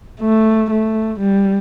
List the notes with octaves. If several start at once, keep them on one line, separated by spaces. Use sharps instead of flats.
A3
A3
G3